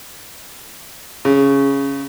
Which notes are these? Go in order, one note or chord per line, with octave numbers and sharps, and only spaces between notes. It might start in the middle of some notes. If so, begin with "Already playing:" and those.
C#3